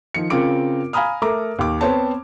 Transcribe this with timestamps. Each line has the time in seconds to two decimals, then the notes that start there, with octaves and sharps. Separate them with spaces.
0.14 D#3 F3 C#7
0.30 C#3 C4 F4 A#4 D6 D7
0.93 F5 G#5 A#5 B5 D#6 F6
1.22 A3 A4 A#4 A#5 D6
1.59 D#2 D6
1.81 B3 C4 C5 C#5 A5